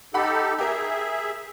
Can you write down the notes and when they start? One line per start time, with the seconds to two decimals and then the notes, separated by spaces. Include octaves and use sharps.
0.14 D#4 G4 A4 F#5 B5
0.59 G4 G#4 A#4 E5